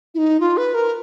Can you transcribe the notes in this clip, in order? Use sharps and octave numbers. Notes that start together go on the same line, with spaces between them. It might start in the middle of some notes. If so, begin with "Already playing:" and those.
E4
D#4
F4
B4
A#4